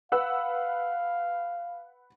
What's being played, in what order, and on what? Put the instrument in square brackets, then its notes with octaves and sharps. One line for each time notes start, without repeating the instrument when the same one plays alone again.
[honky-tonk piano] B4 F#5 E6 [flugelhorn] F5